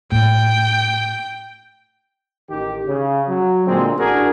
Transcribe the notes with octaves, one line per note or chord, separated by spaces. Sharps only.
A2 G5
A1 D#3 G4
C#3
F#3
A#2 D3 G#3 C4
A1 D4 F#4 G#4 A#4